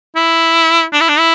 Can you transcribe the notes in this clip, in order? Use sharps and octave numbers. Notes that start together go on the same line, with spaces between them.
E4
D4
E4
D4
E4